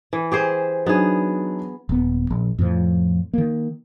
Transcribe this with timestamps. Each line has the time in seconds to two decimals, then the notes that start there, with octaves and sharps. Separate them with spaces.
0.13 E3
0.32 G4 G#4 C5
0.86 F#3 B3 D4 D#4 G#4
1.89 D#1 B3
2.30 A#1
2.59 F2 A2 F3
3.33 D#3 A#3